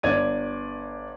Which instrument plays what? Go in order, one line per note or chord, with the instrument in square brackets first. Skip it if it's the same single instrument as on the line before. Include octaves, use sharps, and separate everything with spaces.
[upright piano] G1 D5 G#6 D#7